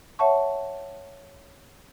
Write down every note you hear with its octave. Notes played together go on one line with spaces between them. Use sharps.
C#5 E5 F#5 A5 C#6